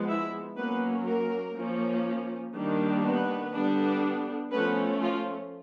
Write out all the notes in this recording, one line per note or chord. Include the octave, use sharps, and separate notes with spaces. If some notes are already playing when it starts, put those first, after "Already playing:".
Already playing: F3 G#3 B3
E4 E5
F#3 A#3 B3 C#4 B4
A#3 A#4
F3 A#3 C#4
D#3 G3 A#3 D4
B3 B4
D3 G3 B3 D4
F3 A3 B3 C#4 B4
F3 F4